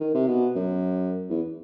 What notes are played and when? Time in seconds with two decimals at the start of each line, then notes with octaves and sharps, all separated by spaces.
0.01 D#3
0.14 C3
0.27 B2
0.56 F#2
1.30 E2